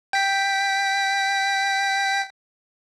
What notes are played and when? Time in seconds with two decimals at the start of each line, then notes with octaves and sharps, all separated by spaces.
0.13 G5 B6